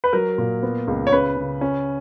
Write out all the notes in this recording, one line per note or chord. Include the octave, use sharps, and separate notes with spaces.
B4
F#3 A#4
A#2
B3
C#2
C#5
C#3 B4
C#3
C#4